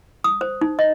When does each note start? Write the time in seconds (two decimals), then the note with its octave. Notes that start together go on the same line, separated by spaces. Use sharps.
0.24 D#6
0.41 C5
0.61 D#4
0.79 D#5